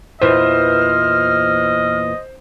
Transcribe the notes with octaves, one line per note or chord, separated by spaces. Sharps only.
E2 A#2 E3 C5 D#5 F6